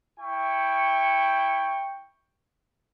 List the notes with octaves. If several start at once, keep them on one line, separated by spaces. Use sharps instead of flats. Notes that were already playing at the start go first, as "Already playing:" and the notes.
E4 G5 C#6